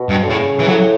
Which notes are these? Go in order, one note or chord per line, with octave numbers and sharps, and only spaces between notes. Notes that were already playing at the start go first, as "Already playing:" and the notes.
Already playing: B2
G2
D3
A2 C#3
E3
A2 F#3